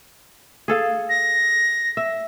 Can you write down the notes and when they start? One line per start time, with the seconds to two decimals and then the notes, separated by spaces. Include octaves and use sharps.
0.68 G#4 A4 F5
1.09 A#6
1.97 E5